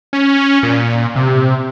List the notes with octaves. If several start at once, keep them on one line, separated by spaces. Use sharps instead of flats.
C#4
A#2
C3